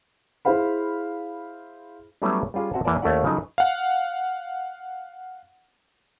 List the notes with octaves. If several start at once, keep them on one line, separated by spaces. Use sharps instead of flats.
E4 G#4 C5 F5 B5
F#3 G3 A3 B3 C#4 E4
G3 C#4 F4 G#4
C4 F#4 E5 F#5 A5
E2 E3 A#3 C#5 D5 A5
D#2 A3 C#4 E4 D5 F#5
C#3 F3 F#3 D#4 A4
F5 F#5